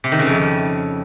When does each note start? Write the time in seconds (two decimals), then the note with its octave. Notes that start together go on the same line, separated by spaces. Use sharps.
0.04 C3
0.12 D#3
0.19 C#3
0.27 F2